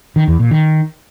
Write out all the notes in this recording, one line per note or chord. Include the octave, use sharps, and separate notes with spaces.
D#3
E2
A#2
D#3